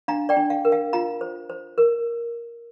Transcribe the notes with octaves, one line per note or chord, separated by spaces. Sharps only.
D4 F5 A#5
D5 G5
D4
F5
A#4
F5
F4 F5 A#5
C5
C5
A#4